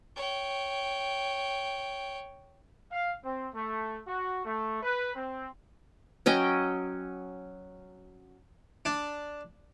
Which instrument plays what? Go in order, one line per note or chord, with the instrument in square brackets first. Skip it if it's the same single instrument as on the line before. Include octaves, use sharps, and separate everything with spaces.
[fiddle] C#5 G5
[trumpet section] F5
C4
A3
F#4
A3
B4
C4
[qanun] F#3 C#4 D#5 G5
[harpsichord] D4